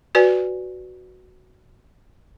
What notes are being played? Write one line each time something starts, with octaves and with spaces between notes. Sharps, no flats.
F#4 B4 D5 G#5